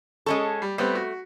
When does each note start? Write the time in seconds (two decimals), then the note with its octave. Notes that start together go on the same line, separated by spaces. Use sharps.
0.26 G#3 C#4 A4 C#6
0.62 G3
0.78 G3 A3 B3 C4
0.95 F#4